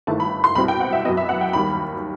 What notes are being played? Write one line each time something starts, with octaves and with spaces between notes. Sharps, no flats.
G1 G2 D#3 A3 E4 A5
B5
C6
C2 B2 G3 C4 E4 B5
G5
F#5
E5
F#2 F#3 B3 D#5
E5
F#5
G5
D#2 D#3 G3 B5